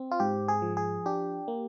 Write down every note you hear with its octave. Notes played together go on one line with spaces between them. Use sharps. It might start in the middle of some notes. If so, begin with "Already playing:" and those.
Already playing: C4
F4
G#2 G4
G#4
F3
G#4
D4 G4
A#3